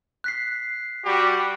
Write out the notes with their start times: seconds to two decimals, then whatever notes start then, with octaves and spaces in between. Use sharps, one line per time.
0.24 F#6 B6 C7
1.05 G3 F#4 G4